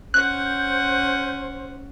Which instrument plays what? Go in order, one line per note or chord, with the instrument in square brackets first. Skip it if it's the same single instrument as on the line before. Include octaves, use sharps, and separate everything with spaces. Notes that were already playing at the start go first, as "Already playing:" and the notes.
[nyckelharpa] C#4 F#5 [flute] C5 [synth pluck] F#6 [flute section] G6